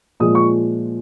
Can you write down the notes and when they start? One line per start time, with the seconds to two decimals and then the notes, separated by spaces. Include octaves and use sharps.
0.20 A#2 F3 G#3 D#6
0.35 C#6